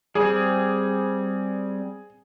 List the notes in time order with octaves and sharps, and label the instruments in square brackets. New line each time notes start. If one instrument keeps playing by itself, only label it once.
[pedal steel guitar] G3 C4 [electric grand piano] G#4